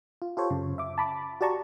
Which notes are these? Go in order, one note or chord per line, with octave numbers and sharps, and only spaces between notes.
F4
F4 G4 A4 C5 C#5
F#2 C#3
E5 D6
A5 B5 D6
F#4 G4 D5 A5 A#5 C#6